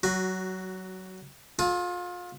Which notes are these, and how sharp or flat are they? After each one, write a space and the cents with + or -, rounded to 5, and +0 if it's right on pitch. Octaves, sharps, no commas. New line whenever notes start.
F#3 +20 F#4 +0
F4 +30 A4 -30